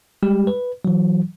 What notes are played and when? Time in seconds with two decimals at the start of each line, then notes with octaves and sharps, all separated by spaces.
0.23 G3 G#3 G4
0.47 B4
0.85 E3 F#3